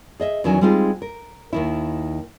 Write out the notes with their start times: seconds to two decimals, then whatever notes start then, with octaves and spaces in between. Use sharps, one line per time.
0.20 G#4 D#5 E5
0.44 E2 D#3 F#3 C#4 E4 G#5
0.61 G3 G#3 C4 D#4 F4 G#4
1.02 A#4
1.53 D#2 D#3 E4